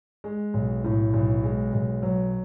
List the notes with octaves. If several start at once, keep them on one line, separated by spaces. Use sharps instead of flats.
G#3
B1
A2
B1
G#3
B1
F#3